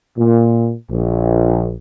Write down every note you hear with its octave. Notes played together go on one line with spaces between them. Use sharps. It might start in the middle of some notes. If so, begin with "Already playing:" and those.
A#2
A#1